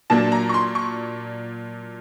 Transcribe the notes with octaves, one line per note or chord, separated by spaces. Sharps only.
A#2 F#3 A#3 D4 A5
A#5
C#6
C6
C#6